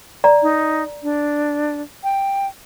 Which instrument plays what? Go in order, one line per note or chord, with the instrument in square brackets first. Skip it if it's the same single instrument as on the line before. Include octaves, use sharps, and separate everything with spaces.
[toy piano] D5 A#5
[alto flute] D#4
D4
G5